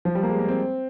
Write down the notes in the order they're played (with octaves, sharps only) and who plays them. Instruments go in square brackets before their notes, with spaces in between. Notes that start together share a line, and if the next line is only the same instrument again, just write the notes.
[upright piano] F3
G3
A#3
G#3
A#3
C4